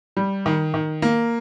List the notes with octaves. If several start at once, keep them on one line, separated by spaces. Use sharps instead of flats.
G3
D#3
D#3
A#3